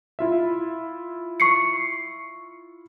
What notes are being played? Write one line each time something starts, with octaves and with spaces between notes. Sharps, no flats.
E4 F4 E5
C#6 C7 C#7